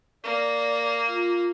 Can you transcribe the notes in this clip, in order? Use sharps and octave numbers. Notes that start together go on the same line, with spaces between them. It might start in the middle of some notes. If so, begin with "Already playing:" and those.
A#3 D5
F4